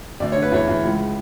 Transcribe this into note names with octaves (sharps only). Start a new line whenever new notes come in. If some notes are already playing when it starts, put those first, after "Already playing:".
D2 D5
D3 C#5
B4
E2 C#5
E2
C#2